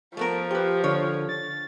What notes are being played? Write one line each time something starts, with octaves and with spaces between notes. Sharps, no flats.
F3 A3 B3 A#4
G4 B4 C5
D3 C#5
A6